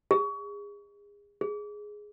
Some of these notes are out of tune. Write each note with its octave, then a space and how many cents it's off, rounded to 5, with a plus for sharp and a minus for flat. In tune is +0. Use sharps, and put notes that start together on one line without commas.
G#4 -35
G#4 +5